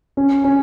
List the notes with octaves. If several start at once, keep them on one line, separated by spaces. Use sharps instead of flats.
C#4
C#4